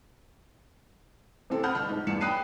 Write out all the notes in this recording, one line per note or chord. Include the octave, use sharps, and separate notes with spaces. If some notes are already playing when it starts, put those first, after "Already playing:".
C3 E3 C4 A4
F#5 B5 D#6 F6 G6
G1 A5 F6
G#2
E2 G2 C#7 E7
G5 B5 D#6 F#6 C7 D#7